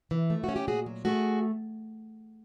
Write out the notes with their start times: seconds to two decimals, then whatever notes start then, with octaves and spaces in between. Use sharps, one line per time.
0.11 E3
0.30 A3
0.44 C#4 F#4
0.56 G4
0.67 A#2 F#4 G#4
0.86 F#3
1.05 A3 F#4 G#4